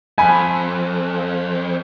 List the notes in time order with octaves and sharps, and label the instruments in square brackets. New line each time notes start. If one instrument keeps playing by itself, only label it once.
[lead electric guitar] F2 [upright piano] G#5 B5